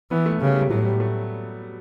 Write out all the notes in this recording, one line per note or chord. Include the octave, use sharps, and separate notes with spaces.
E3 B3
A3
C#3 G3
G3
A2 F#3
G3
A3